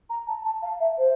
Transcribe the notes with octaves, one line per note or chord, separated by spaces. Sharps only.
A#5
A5
A5
F5
E5
C5